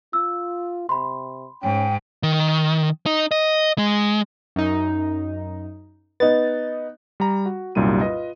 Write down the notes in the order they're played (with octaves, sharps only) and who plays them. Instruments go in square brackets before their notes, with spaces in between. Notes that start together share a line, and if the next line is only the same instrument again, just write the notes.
[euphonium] F4 [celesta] E6
[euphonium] C3 [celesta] B5 C6
[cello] G#2 [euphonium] C#4 [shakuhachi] G5
[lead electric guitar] D#3
D#4
D#5
G#3
[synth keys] F#2 D#4
[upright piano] B3 D#4 [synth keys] A6
[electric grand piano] G3 A#5
F#4
C2 F#2 A#2 G3 D#4 D#7
F4 B4 D#5